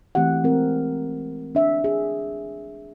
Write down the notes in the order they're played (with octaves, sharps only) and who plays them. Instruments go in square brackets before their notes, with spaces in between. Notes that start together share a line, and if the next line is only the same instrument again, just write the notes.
[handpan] E3 A3 C4 G4 F#5
G#3 C4 A#4
D4 E5
G#4